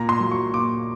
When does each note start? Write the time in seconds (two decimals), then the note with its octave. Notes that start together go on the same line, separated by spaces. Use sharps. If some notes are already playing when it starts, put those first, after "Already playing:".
Already playing: A#2 A#5
0.09 C6
0.20 F#3
0.31 C#6
0.53 A#2 D6